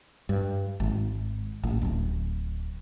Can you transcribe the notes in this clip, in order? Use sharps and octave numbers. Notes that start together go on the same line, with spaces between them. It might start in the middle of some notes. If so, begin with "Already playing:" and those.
G2
G#1
A1
D1